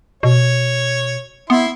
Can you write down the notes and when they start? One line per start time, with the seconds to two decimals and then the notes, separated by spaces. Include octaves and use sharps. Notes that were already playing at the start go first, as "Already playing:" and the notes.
0.23 B2 C#5
1.50 B3 E4 C6